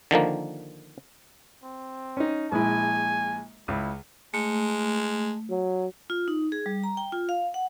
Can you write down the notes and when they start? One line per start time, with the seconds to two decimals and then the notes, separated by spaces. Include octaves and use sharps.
0.11 D3 D#3 F3 A#3
1.63 C4
2.17 C#4 D#4
2.52 A#1 G#3 E4 G#5
3.68 C#2 E4
4.34 G#3 A3
5.50 F#3
6.10 F4
6.28 D#4
6.52 G#4
6.66 G3
6.84 A#5
6.97 G5
7.12 F4
7.29 F5
7.54 F#5